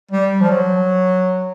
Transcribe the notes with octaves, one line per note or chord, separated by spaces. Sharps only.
G3
F3
F#3